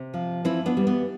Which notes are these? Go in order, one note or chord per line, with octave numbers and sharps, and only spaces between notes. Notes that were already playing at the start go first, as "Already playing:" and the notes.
Already playing: C3
F3
E3 C4 E4
B3 D4
G3
B3